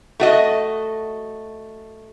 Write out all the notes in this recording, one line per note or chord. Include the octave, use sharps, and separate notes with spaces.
A3 F#4 D#5